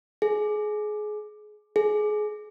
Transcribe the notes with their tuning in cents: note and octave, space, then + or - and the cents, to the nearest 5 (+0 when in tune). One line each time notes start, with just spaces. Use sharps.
G#4 +25
G#4 +25